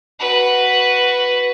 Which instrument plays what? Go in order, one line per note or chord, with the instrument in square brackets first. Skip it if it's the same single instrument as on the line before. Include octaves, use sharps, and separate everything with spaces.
[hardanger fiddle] F#4 B4